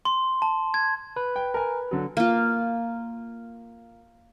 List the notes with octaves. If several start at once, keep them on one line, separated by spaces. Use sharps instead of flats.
C6
A5
G#6
B4
G5
A#4 G#5
D3 F#3
A#3 F4